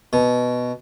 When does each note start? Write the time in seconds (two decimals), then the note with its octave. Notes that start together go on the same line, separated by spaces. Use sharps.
0.13 B2